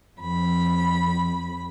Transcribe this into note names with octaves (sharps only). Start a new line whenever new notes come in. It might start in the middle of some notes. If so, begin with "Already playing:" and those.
F2 B5